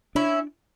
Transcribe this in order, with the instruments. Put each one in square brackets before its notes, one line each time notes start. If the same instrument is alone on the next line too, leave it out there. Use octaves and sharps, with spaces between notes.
[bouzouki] C#4 E4 [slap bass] D4